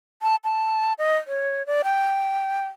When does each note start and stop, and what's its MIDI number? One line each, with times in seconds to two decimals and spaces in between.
0.22 0.36 81
0.44 0.93 81
0.99 1.17 75
1.27 1.65 73
1.67 1.82 74
1.84 2.66 79